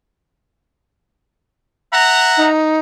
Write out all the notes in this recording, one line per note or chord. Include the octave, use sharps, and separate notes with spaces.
E5 F#5 A#5
D#4